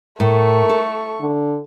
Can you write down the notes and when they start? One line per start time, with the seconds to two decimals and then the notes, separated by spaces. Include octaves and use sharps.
0.20 A2 A3 A#4 C#6
0.69 A4
1.20 D3